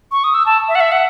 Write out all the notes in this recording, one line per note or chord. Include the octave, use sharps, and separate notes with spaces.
C#6
D#6
E6
A5
E5
F#5
E5
F#5